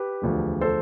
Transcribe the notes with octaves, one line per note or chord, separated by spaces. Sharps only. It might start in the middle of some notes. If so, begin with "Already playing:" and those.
Already playing: G4 B4
E1 D2 D3 F3
A4 C5